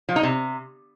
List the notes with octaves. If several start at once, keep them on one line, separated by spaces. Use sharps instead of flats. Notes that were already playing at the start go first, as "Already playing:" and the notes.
F3
D#4
C3